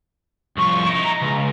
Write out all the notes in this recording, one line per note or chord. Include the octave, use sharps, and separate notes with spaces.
C2 F3 C#6
D#4 E4
A#5
C#2